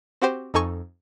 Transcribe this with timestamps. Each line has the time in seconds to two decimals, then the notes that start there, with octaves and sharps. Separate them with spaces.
0.22 C4 F#4 G4 C5
0.54 F2 D#4 A4 G#5 C#6